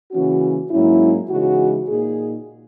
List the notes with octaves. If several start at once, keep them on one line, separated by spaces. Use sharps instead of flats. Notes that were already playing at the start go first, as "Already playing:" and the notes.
C#3 E3 A#3 C#4 F#4
G#2 F#3 A#3 C#4 E4
C#3 E3 G#3 D#4 F#4
A#2 A#3 D#4 G#4